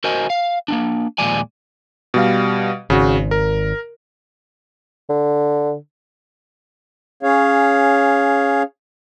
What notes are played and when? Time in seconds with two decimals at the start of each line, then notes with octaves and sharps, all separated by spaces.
0.04 F#4 A#4 C5 D#5 G#5
0.30 F5
0.68 A#3 C4 D4
1.18 D#2 A#2 F3 G#3 D5 G#5
2.14 B2 G3 F5
2.90 G#1 C#3 F#4
3.31 A#4
5.09 D3
7.23 C#4 G#4 C#5 F5